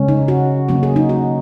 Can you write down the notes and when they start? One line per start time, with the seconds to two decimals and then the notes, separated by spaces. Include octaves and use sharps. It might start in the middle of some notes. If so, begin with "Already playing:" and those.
Already playing: C#3 G#3 C#4
0.08 D#4
0.28 F#4
0.69 C#3 F#3 A#3 C#4 F#4
0.83 G#4
0.96 D#4
1.09 F#4